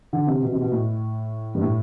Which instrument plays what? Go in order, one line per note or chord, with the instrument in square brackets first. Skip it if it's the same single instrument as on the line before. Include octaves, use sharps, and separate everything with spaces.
[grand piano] D3
C3
B2
C3
B2
A2
G2
A2